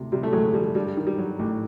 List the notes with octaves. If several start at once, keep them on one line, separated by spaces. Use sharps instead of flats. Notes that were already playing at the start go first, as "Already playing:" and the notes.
Already playing: D2 C3
C3 G3
A3
D2 F#3 G#3
F3 G3
G2 G3
D#3
G3
F#3
A1